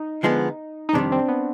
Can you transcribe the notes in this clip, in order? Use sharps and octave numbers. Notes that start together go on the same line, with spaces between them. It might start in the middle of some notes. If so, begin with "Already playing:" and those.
Already playing: D#4
D3 F3 G#3 B3
D#4
F2 C3 D#3 G3 D4
C4
B3